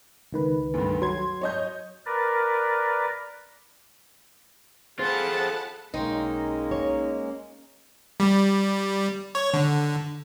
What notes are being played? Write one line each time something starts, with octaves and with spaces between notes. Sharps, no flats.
C#2 D#3 B4
D2 G2
F#3 C6 G#6
C#5 D#5 G6
A#4 B4 D5
F4 G#4 A4 C5 F#5 A5 B5
B1 G#3 A#3 C#4 D#4 G5 C6
C#5
G3
C#5
D3